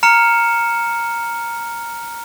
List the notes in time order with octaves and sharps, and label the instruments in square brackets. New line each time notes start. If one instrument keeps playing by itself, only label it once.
[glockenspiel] A#5 F6 C#7 E7